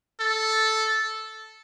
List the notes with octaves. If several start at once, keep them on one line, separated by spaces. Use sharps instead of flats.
A4